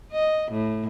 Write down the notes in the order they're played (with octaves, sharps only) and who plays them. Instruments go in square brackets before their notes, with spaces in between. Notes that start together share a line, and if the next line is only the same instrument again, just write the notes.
[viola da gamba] D#5
A2